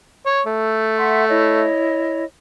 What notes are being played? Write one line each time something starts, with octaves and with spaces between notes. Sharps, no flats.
C#5
A3
E5 F#5 C6
E4 C#5 D#5